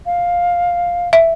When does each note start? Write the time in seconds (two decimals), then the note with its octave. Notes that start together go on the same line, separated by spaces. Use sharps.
0.06 F5
1.13 E5